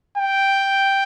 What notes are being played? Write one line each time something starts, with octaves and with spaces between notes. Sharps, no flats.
G5